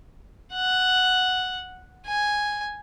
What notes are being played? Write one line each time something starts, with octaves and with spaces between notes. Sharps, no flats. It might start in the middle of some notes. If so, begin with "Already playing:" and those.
F#5
G#5